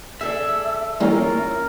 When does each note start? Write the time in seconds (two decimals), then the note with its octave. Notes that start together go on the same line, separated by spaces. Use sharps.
0.21 G#4 A4 D5 E5
1.00 A1 G2 A#3 C#4 E4 F4 A#4